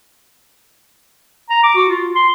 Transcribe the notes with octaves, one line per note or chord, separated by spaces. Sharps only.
A#5
D6
F#4
F4
C6